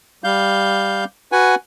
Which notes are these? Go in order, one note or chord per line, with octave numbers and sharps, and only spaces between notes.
G3 F5 G6
F#4 B4 F#5 G#5